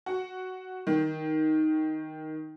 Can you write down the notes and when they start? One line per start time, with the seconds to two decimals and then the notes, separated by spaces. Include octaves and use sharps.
0.06 F#4
0.87 D#3